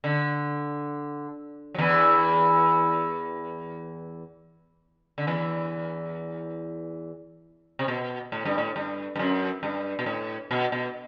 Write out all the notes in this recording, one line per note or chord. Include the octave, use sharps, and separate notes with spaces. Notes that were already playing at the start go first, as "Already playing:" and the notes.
D3
F#3
E2 E3
D3
E2 E3
C3
B2
A2
G2
A2
G2
G2
F#2
G2
B2
A2
B2
B2